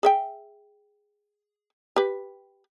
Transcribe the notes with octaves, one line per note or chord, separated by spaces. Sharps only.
G#4 E5 G5
G4 B4